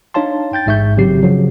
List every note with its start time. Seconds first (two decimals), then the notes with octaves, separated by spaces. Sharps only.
0.14 D4 D#4 C#5 F5 A5 C6
0.53 G5 G6 A6
0.66 A1 G#2 E5 C#6 G6
0.97 A1 C#3 F#3 C4 G4 C7
1.23 C#3 F3 F#3